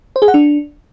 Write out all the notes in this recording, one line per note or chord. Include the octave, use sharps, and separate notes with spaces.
C5
G#4
F#5
D4